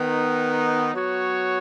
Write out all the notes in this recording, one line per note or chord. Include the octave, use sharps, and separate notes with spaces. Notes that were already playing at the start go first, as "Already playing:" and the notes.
Already playing: D#3 B3 D#4
F#3 B3 F#4 C#5